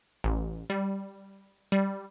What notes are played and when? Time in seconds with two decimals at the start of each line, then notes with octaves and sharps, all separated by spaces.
0.24 A1
0.70 G3
1.72 G3